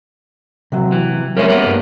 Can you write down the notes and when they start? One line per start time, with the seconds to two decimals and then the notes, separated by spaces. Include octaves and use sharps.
0.72 C3 F#3
0.92 E3
1.37 G3 G#3 C#4 A#4 C#5 E5
1.48 G3 A#3 B3
1.66 G2